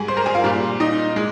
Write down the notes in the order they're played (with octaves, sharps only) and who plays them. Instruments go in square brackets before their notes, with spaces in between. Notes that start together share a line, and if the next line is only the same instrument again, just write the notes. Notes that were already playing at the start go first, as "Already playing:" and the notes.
Already playing: [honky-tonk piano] G#2 G3 G#4 G#5
C5 C6
A#4 A#5
G#4 G#5
F4 F5
A#2 G3
D#4 D#5
G#3